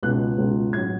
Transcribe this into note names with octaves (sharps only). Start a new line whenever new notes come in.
C#2 B2 G#3 F#6
C#2 B2 G#3
A1 F#3 G#6